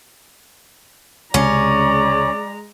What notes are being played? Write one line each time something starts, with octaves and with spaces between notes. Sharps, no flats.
C#2 C3 G#3 C#4 D5 A#5